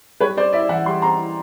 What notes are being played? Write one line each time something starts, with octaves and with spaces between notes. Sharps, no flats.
G3 B4 C#5
C4 C5 D5
E4 D5 E5
E3 E5 F#5
G3 C6
C4 A#5 C6
E4